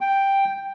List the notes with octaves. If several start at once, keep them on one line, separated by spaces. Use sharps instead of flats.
G5